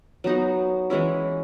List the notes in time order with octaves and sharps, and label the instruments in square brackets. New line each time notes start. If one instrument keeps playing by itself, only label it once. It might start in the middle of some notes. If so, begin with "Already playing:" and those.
[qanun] F#3 B3 D#4 F#4
E3 G#3 C#4 E4